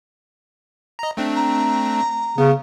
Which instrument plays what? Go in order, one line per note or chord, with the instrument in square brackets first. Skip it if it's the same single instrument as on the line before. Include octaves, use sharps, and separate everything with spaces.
[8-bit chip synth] D#5 A#5
A3 C4 D4
[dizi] A#5
[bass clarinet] C#3 [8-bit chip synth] B3